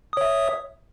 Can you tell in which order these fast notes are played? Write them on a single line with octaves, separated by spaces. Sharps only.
D#6 C#5 E5